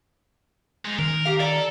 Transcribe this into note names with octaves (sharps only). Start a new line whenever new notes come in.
G#3 D#4
D#3 A#4
G4 F5
A4 D5 A#5